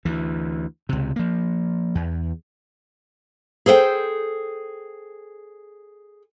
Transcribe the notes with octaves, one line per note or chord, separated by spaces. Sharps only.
D2 E3
C#2 C3
F3 A#3
E2
G#4 A4 C5 F5 G5